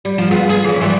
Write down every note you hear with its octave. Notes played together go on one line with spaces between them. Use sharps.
G3
F3
B3 F4 G#4
G#4
E3 C#4
E3 F3 G3